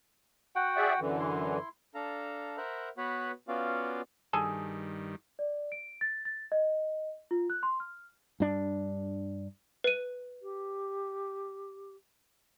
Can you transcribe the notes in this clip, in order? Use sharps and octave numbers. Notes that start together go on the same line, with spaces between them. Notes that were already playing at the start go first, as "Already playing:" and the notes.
F#4 F#5 G5
G#4 D5 E5
F#2 D3 E3
E4 C6
D4 A4 F5 A#5
A#4 C5 E5 F#5 A#5 B5
B3 F#4 B4 C#5 F#5 B5
B3 C#4 F4 F#4 D5 F5
G2 D#3 G#4 A4
D5
D7
A6
A6
D#5
F4
F#6
C6
F6
G2 D4
B4 D#7
G4